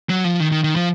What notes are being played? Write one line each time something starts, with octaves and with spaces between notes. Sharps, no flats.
F#3
F3
D#3
D#3
D#3
F3